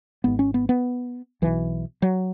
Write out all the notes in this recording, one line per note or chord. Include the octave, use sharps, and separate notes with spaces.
G#1 G#2 B3
C#4
B3
B3
B1 B2 E3
F#3